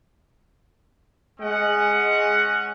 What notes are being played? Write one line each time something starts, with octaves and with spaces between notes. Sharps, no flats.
G#3 C#4 D#5 F#5